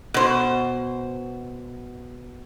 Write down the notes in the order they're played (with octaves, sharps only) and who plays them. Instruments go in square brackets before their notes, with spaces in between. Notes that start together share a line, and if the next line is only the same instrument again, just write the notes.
[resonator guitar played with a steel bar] B2 C5